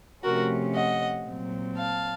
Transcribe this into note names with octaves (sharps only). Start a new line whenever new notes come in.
C3 F3 A3 C#4 F#4 A#4
D#5 F#5
A#2 F#3 C4
F5 A5